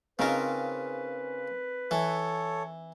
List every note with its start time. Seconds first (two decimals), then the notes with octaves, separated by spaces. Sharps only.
0.19 C#3 C4 D#4 F4 A#4 B4
1.91 E3 A4 C#5